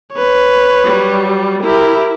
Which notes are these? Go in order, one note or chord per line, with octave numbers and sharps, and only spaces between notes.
B4 C#5
F#3 G3
E4 G4 A#4